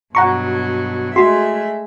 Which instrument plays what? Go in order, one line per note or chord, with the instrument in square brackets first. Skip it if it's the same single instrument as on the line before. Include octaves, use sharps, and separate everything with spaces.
[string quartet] G2 B2 F#3 [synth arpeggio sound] F#5 A#5 C#6
[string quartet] G#3 A3 E5 [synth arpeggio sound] F#4 C6